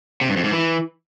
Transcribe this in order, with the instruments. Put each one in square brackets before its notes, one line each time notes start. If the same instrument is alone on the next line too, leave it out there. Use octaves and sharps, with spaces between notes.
[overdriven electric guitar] C3
G2
F2
G#2
E3